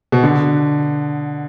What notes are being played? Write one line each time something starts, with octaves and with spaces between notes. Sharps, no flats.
B2
D3